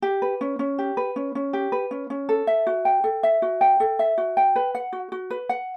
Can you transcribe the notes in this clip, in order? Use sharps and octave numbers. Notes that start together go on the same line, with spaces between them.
G4
B4
C#4
C#4
G4
B4
C#4
C#4
G4
B4
C#4
C#4
A4
E5
F#4
G5
A4
E5
F#4
G5
A4
E5
F#4
G5
B4
F#5
F#4
F#4
B4
F#5